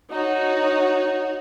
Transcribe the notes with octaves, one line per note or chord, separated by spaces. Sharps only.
D#4 F#4 C#5